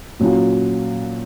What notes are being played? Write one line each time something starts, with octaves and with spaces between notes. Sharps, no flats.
A#2 F#3 C#4 F4